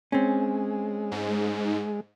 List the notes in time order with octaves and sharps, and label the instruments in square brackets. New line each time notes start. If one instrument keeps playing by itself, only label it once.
[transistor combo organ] G#3 [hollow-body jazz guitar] C4 C#4
[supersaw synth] G#2